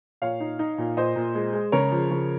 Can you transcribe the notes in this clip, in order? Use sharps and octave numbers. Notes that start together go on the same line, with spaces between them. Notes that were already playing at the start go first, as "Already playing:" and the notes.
A#2 C#5 F5
D#4
D#4
A#2
A#2 C5 D#5
A#2
G#3
G#3
C#3 A#4 C#5
F3
C#3